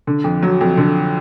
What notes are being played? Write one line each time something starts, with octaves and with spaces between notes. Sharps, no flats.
D3
F2
F#3
F2
D3